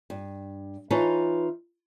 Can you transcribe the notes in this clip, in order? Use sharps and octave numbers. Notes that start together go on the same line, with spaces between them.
G2
E3 D#4 F4 B4 C#5 A5